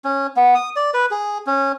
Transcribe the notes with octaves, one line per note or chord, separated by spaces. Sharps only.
C#4
B3
D#6
D5
B4
G#4
C#4